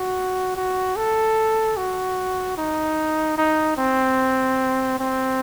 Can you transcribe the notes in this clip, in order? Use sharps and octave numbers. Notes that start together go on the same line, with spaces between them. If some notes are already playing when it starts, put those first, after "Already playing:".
Already playing: F#4
F#4
A4
F#4
D#4
D#4
C4
C4